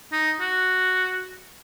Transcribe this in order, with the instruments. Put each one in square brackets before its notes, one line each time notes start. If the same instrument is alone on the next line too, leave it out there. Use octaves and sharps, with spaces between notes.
[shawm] D#4
F#4